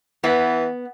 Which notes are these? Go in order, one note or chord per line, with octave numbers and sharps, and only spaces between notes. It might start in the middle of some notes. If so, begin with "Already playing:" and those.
E3 B3